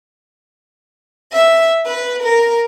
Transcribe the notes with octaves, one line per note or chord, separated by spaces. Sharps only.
E5
B4
A#4